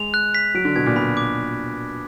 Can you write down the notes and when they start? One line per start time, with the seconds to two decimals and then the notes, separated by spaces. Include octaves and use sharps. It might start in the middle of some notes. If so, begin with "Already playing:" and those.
Already playing: G#3 F7
0.14 F#6
0.35 B6
0.55 F#3 D7
0.65 D3
0.76 B2 G#6
0.86 A#2
0.96 B2 B5
1.17 D6